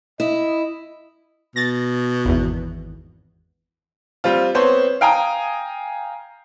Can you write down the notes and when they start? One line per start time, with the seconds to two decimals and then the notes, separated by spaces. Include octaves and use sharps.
0.20 E4 D#5
1.56 B2 A6 A#6
2.25 G#1 E2
4.24 G3 C4 F4
4.55 B3 C4 C5 C#5
5.01 F5 G5 G#5 A#5 D#6